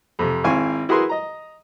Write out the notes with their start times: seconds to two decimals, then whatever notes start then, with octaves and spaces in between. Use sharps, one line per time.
0.19 F2 C3
0.44 G#1 C4 E4 F5 G#5 C#6
0.89 E4 F#4 G#4 A#4 B4 C6
1.09 D#5 A#5